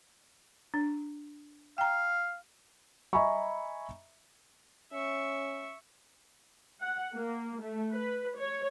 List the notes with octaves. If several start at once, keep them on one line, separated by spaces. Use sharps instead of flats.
D4
F5 G5 A#5
D#5 E5 G#5 A#5 B5 C#6
C#4 E5 C#6
F#5
A#3
A3
B4
C#5